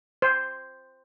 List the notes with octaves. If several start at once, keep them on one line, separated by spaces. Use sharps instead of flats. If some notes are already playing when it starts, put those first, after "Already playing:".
C5